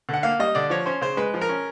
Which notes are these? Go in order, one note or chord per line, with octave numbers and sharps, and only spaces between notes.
D3 F#5
A#3 F5
G3 D#5
D3 D5
F3 C#5
C#4 C5
C#3 C5
G#3 B4
F3
A#4
C#4